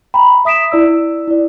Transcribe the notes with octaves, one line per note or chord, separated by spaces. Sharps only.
G5 A#5 B5
E5 D#6 B6 D7 E7
E4 D5 E6
E4 D5